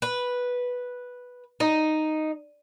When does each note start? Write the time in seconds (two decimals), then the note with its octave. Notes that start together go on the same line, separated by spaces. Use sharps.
0.02 B4
1.60 D#4